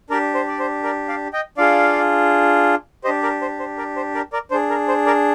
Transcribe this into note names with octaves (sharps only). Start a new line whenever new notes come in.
D4 G4 A#4 D5
C5
D5
C5
A#4 D5
D5 F5
D#5 G5
D4 F4 G#4 D5 F5
D4 G4 C5 D#5
A#4 D5
C5
C5
A#4 D5
C5
A#4 D5
A#4 D5
D4 G#4 C5
A#4
C5
A#4 D5